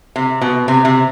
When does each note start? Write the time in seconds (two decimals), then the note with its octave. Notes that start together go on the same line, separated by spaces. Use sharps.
0.16 C3
0.41 B2
0.68 C3
0.85 C3